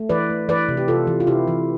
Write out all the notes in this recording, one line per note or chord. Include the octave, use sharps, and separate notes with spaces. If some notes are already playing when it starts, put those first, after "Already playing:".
Already playing: A3
E3 B4 D5
A3
E3 B4 D5
C3
G4
C3 F4 A4
E3
F4
C3 E4 G4
E3